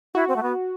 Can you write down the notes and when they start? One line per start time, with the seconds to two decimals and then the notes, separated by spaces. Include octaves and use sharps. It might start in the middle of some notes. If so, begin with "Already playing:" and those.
0.15 E4 F#4
0.28 C4
0.36 A3
0.43 B3